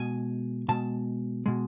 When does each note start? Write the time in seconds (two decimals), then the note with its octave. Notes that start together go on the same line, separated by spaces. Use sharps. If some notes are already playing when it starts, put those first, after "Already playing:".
Already playing: B2 G#3 G#5
0.68 B2 G#3 A5
1.46 B2 G#3